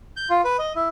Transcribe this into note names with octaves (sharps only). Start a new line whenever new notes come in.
G6
F4
B4
D#5
E4